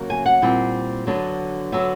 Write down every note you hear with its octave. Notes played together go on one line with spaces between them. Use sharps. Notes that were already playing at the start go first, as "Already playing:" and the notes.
Already playing: C#3 F#3 A#3
G#5
F#5
A#2 G3 C4 E4
D3 F#3 B3 D4
D3 F#3 B3 E5